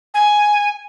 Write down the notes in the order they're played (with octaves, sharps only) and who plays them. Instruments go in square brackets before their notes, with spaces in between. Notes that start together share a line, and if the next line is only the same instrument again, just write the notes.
[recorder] G#5